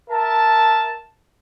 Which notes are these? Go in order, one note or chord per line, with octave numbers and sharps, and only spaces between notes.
A#4 E5 A5